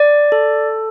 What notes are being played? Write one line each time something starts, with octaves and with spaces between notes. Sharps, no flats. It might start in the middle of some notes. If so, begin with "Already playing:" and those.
Already playing: D5
A4